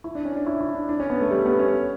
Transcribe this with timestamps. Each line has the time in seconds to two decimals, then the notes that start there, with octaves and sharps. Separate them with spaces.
0.04 E4
0.15 D4
0.25 C#4
0.36 D4
0.47 E4
0.61 E4
0.75 D4
0.89 D4
1.00 C#4
1.10 B3
1.21 A3
1.31 G3
1.46 B3
1.59 C#4